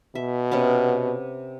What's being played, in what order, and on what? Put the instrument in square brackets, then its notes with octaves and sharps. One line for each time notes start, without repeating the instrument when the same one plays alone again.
[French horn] B2 [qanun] E5
[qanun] C3 B3 C#4